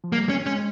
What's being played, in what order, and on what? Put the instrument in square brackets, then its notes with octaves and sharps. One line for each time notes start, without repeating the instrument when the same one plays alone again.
[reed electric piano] F3
[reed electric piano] G3 [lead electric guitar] A#3
[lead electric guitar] C#4
[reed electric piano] G#3 [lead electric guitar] C#4